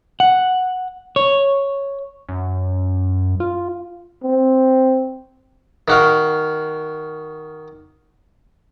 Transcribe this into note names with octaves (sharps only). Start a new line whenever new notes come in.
F#5
C#5
F#2
F4
C4
D#3 F#4 F5